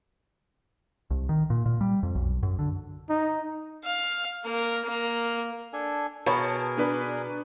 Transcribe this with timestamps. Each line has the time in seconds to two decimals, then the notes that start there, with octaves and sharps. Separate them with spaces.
1.10 C2
1.29 D#3
1.50 A#2
1.66 A#2
1.81 G3
2.03 F2
2.15 B1
2.43 F#2
2.59 D3
3.09 D#4
3.84 F5
4.45 A#3 A#4
4.84 A#3
5.73 D4 A4 G#5
6.26 B2 G#4 A#4 C#5 A5
6.77 B3 D4 B4